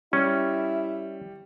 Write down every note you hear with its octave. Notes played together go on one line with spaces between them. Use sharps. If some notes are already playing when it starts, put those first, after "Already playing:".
G3 C#4 E4 E5